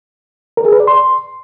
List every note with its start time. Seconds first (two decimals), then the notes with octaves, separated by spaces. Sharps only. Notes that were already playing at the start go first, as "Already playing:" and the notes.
0.57 A#4
0.65 G#4
0.72 B4
0.80 D5
0.87 C6